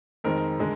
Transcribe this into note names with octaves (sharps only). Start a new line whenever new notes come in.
F2 D#3 G#3 C4 A#4
D3 G#3